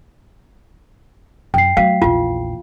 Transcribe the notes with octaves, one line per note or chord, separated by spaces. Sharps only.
F#2 G5 C7
F#3 A3 F5
A#1 E2 F4